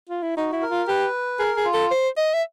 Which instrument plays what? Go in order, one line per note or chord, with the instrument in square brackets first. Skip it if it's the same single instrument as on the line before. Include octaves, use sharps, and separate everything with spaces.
[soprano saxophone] F4
E4
[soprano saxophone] D#4 [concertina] F#4
[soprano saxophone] E4
[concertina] A#4
[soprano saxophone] F4
[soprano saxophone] G4 [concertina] B4
[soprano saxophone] G#4 [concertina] A#4
[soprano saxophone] G#4
[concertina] F4
[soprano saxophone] A4
C5
D#5
E5